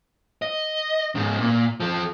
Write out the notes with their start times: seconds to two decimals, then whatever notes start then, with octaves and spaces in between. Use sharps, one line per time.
0.42 D#5
1.15 G#2 C#3
1.41 A#2
1.80 F3 A4